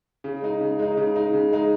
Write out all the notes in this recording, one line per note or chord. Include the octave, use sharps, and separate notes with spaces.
C#3
G#3 D#4
C#3
G#3 D#4
C#3
G#3 D#4
C#3
G#3 D#4